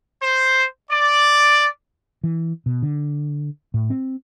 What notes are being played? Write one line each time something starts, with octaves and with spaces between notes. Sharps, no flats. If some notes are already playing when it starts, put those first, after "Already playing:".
C5
D5
E3
B2
D3
A2
C4